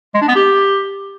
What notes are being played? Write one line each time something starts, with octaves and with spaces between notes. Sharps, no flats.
G#3
D4
B3
G4